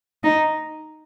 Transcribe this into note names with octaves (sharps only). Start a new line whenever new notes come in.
D#4